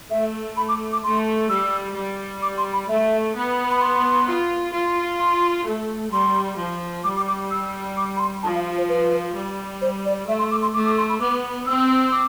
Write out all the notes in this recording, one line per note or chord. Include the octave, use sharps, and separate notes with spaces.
A3 E5
B5
D6
D6
A3 C6
G3 E6
G3
D6
C6
B5
A3 E5
B3
B5
C6
F4
F4
C6
A3
G3 C6
F3
G3 D6
D6
D6
E6
D6
B5
C6
F3 A5
F5
C5
B4
G3
C5
D5
A3 E5
C6
D6
C6
A3 D6
D6
C6
B5
B3 D6
C4 E6
D6